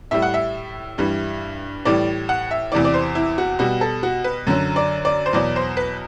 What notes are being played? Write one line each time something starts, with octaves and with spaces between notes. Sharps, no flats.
A2 G3 E5
F#5
E5
G2 E3 G3
A2 E3 G3 D5
F#5
E5
E2 C3 E3 D5
D5
C5
E4
F#4
B2 G3 F#4
A4
F#4
B4
F#2 D3 F#3
D5
D5
C5
E2 B2 F#3 D5
C5
B4